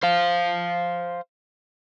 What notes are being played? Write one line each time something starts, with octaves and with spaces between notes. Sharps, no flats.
C5 F5